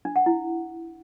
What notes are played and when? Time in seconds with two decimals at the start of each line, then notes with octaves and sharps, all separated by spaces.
0.05 D4
0.16 F#5
0.26 E4